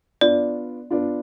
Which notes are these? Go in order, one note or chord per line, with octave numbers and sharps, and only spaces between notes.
B3 D4 F4 D5
B3 D4 F4